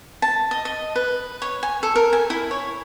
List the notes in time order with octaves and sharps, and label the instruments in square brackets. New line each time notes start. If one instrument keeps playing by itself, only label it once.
[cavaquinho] A5
D#5
D#5
B4
C#5
G#5
A4
A#4
G#5
E4
C#5